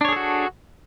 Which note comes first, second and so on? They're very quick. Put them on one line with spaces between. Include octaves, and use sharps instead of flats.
D4 C#5 G#4 A4 F#4